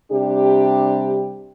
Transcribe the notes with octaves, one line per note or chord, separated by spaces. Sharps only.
C3 G3 D4 G4